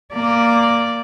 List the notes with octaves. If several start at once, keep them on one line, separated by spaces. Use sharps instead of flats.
A#3 D5